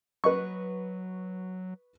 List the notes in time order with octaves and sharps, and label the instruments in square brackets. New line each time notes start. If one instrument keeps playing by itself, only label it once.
[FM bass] F#3 [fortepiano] B4 D#5 C#6